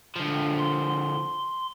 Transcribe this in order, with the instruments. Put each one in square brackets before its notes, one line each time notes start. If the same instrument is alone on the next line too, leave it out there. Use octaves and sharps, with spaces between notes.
[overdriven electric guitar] D3 F3
[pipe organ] C6